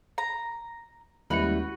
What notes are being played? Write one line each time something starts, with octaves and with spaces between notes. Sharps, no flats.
A#5
D#2 G3 G#3 C#4 E4 F#4 G4 B4